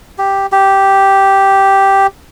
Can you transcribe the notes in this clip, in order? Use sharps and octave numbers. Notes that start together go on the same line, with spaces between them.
G4
G4